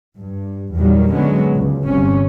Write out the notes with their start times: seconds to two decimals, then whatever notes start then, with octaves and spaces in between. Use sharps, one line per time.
0.17 G2
0.75 E2 A#2 D#3 F#3 G3
1.11 D3 F#3 G#3 B3 C#4
1.55 C#2
1.84 G1 C3 C#4